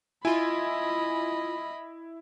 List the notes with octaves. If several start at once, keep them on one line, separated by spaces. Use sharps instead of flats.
E4 F4 D#5 G#5 B5